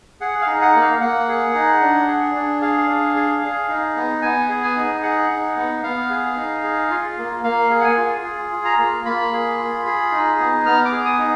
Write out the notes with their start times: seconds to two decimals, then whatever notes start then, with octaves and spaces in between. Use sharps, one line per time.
0.20 G#4 F#5
0.41 F5
0.47 D#4
0.62 F#5
0.75 A#3
0.81 F5
1.01 A#3 F#5
1.28 G#4
1.54 D#4
1.81 D4
2.08 G#4
2.35 D4
2.61 G#4 F5
2.89 D4
3.16 G#4
3.42 G#4
3.69 D#4
3.96 B3
4.22 B3 G#5
4.49 G#4
4.63 G#5
4.76 D#4
5.03 G#4 F#5
5.30 D#4
5.57 B3
5.83 B3 F5
6.10 G#4
6.36 D#4
6.63 G#4
6.90 F4
7.18 A#3
7.43 A#3 F5
7.70 G#4
7.81 F#5
7.84 G#5
7.97 F4
8.24 G#4
8.52 F4
8.65 A#5
8.78 A#3
9.05 A#3 B5
9.32 G#4
9.58 F4
9.86 G#4
10.11 D#4
10.39 B3
10.65 B3 F6
10.85 D6
10.92 G#4
11.05 D#6
11.19 D#4